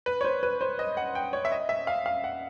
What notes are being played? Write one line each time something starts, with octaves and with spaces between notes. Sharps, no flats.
B4
C#5
C5
B4
C5
D#5
F#5
G5
C#5
E5
D#5
E5
F5
F5
F#5